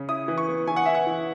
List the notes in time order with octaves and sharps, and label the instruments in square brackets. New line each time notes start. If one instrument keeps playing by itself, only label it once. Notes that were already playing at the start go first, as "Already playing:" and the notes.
Already playing: [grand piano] C#3
E4 D#6
E3
C#6
B3
E3 G#5
F#5
E4 E5
F#5
E3